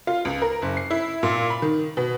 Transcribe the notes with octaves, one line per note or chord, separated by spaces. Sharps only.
F4
C#2
A#4
F#1
C7
E4
A#2
B5
D#3
B2